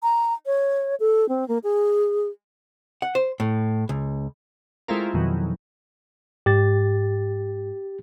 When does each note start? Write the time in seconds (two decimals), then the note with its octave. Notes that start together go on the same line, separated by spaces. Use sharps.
0.03 A#5
0.46 C#5
1.00 A4
1.29 C4
1.48 A#3
1.64 G#4
3.02 F#5
3.15 C5
3.40 A2
3.89 C#2
4.88 G#3 A3 C4 E4 F4 A#4
5.14 F2 B2 D#3 E3 F#3
6.46 G#2 G4 A6